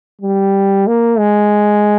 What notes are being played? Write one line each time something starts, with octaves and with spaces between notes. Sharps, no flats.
G3
A#3
G#3